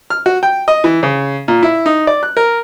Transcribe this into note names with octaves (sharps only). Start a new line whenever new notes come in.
F6
F#4
G5
D#5
E3
C#3
A#2
E4
D#4
D5
F#6
A#4